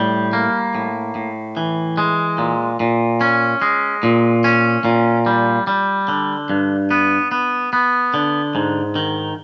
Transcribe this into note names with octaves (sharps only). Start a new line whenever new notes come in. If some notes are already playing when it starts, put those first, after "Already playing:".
Already playing: A2 G3
A#3
A2
A2
E3
G#3
A#2
A#2
C#4
G#3
A#2
C#4
A#2
G3
G3
D3
G2
B3
B3
B3
D3
G#2
D#3